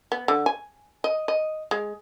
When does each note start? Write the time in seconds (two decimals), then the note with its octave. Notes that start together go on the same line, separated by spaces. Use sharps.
0.12 B3
0.28 D3
0.46 G#5
1.04 D#5
1.28 D#5
1.71 G#3